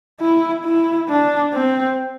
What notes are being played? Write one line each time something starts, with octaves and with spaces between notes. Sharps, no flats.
E4
E4
D4
C4